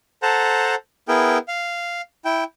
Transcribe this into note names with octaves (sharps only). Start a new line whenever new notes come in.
A4 C5 F#5 A5 A#5
B3 E4 G#4 A#4 G5
F5
E4 G5